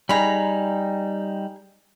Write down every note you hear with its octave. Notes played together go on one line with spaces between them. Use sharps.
G3 D#4 G#4 A#5 B5